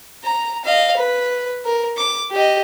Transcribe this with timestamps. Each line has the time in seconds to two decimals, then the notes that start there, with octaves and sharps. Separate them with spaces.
0.24 A#5
0.65 D#5 F5
0.96 B4
1.65 A#4
1.97 D6
2.31 G4 D#5